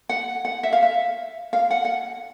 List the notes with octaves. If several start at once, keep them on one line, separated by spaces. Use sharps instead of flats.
F#5
F#5
E5
F5
E5
F5
F#5
F#5